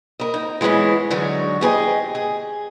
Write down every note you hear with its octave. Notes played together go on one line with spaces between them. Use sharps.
A#4 D#5
D#4
E3 G#3 B3 C#4 E4
D3 F#3 G#3 D#4 F#4
G4 G#4 B4 D#5
G#4